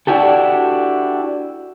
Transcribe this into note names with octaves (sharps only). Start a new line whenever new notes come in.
D4 E4 F#4 G4 A4